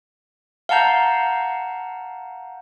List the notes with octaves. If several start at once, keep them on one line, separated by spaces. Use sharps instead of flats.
F5 F#5 A5 A#5 G6